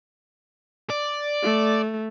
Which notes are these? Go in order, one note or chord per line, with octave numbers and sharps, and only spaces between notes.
D5
A3